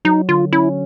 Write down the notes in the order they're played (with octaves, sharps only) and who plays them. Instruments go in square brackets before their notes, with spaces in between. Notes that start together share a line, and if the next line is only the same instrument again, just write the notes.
[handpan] F#3 [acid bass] D#4
[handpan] D3 [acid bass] F4
[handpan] C#4 [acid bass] E4